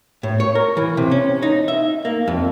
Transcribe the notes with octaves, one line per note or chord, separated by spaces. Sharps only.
A2
C#5
A#4
E3
C3
C#4
D#4
E5
A#3
F2